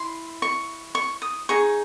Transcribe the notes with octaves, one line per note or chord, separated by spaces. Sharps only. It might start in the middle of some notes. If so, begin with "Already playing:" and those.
Already playing: E4 C6
C#6
C#6
D#6
D#4 G#4 C#6